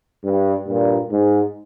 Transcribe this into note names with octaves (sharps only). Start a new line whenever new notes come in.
G2
G2 A#2
G#2